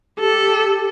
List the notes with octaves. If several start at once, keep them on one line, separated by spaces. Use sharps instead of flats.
G4 A4